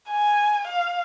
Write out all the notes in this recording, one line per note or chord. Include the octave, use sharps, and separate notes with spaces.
G#5
F5